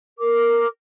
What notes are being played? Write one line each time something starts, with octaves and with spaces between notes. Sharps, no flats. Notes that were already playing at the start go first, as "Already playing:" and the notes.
A#4 D6